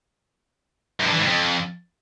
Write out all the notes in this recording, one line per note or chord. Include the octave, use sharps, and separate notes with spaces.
F#2
G2
E3
G#2
F2